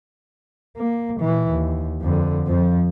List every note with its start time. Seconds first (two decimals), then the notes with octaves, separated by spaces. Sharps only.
0.77 A#3
1.20 A#2 E3
1.50 D#2
2.01 F2 D3
2.47 F2 F3